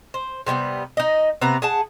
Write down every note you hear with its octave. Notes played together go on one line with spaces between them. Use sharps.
C5
C3 G3 A#3 B3
D#4 D#5
C3 B3 B4 A#5
G#4 F#5 A5